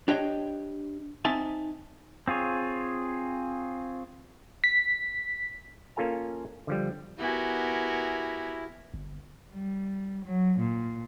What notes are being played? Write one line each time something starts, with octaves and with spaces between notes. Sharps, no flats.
D4 G4 C#5 D#5 G5
C4 D#4 E5 G#5 A5
C4 F4 G#4 C#5
B6
A#3 C#4 F4 A4 G#5 A#5
D3 F3 G3
B3 E4 F#4 G4 A#4 G#5
G1
G3
F#3
A#2